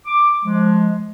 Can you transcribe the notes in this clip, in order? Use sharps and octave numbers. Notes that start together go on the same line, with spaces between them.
D6
F3 G#3